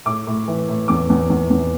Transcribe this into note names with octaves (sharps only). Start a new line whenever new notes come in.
A2 D6
A2
E3
A2
E2 D6
E2
E2
E2